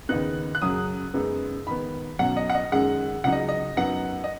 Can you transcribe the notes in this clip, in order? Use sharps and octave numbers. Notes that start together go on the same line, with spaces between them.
D#2 C#3 B3 D#4 F#6
F#6
F#2 C#3 F#3 C#4 D#6
F#2 C#3 G#3 B3 D#4
G#2 D#3 B3 B5
B1 B2 F#3 C#4 F#5
D#5
F#5
D#5
F#2 D#3 G#3 C#4 F#5
C#2 C#3 F#3 D#4 F#5
D#5
D#5
F#2 F#3 B3 D#4 F#5
D#5